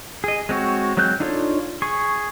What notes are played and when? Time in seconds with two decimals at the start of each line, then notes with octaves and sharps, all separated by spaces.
0.24 G#4 D#5
0.49 G#3 C4 F#4 C#5
0.97 F#3 G#3 C4 F#6 G6
1.20 D4 D#4 F4 A4 C#5
1.82 G#4 C#6